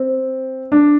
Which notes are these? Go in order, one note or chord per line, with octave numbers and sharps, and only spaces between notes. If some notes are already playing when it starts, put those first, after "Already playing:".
Already playing: C4
D4